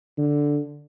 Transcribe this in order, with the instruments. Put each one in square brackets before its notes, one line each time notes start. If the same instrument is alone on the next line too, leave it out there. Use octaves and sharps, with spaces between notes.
[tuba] D3